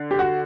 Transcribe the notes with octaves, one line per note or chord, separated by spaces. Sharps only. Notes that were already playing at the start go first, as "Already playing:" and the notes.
Already playing: D3
G4
F#4